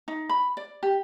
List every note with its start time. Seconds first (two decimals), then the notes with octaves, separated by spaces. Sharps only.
0.08 D#4
0.29 B5
0.57 D5
0.83 G4